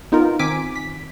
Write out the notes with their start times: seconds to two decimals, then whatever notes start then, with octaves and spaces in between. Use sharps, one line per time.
0.12 B3 D#4 F4 A#4
0.39 D#3 C4 G#5 D6 B6 D7
0.76 B6